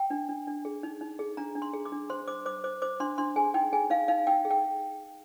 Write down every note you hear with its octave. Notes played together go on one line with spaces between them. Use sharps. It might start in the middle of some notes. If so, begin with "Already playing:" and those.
Already playing: G5
D4
D4
D4
G#4
D#4
D#4
G#4
D4 A#5
D4
C6
G#4
D6
D4
C5 C6
C5 D6
C5 D6
C5 D6
C5 D6
D4 C6
D4 C6
G#4 G#5
D#4 G5
G#4 G#5
D#4 F5
D#4 F5
D#4 G5
G#4
G5